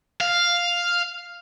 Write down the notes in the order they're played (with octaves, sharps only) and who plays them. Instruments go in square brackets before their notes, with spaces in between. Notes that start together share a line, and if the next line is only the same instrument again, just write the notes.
[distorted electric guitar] F5